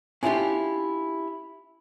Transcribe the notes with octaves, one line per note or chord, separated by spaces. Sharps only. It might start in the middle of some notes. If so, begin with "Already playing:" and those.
C#4 D4 E4 F4 G4